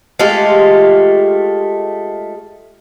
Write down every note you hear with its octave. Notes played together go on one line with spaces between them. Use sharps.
G#3 A3 F4 G4